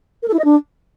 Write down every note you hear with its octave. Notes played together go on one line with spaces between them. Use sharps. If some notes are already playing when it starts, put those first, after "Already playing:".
A#4
A4
E4
D#5
D4